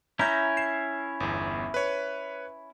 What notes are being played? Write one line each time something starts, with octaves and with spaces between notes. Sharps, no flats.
C#4 E4 A#5 G6 A#6
C7 E7
G1 E2
B4 C#5